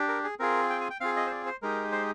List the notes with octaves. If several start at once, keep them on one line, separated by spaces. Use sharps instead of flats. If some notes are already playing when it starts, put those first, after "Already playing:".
Already playing: D4 G4
A#4
G#4
C4 F4 G#4 A#4
G5
G#5
G5
C4 F4 G#4 F5
D#5
C5
D5
C5
G#3 D#4 G4 A#4
C5